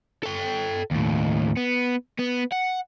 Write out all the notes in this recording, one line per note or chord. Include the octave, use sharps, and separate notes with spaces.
A4 G5
D#2 A2
B3
B3
F#5